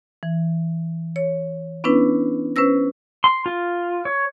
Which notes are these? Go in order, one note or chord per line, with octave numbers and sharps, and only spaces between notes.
E3
C#5
B3 C#4 D4 E4 B4
C#4 B4 C5 E6 A#6
C6
F4
C#5